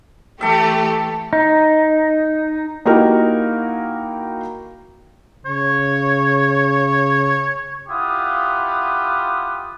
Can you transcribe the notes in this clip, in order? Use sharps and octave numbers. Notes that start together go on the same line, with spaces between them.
E3 A3 G4 A4 E5
D#4
A#3 D#4 E4 F#4 G4 A#4
C#3 C#5
E4 F4 G4 F#5 D#6